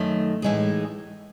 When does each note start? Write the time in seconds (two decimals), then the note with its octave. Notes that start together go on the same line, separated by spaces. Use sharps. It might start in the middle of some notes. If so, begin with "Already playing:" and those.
Already playing: F#2 D#3 A3
0.42 A2 E3 G#3 D#4 G#4